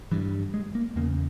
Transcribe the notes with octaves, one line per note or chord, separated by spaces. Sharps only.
G2 E3
G#3
A#3
E2 C#3 A#3